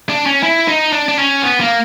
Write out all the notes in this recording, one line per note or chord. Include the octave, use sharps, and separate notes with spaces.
D4
C#4
E4
D#4
D4
D4
C#4
B3
A#3